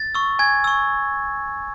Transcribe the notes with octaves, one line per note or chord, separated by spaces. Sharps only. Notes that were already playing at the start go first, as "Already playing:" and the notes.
Already playing: A6
C#6 E6
G#5 G#6
C#6 E6